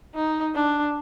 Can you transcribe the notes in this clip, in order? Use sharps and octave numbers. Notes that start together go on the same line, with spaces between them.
D#4
D4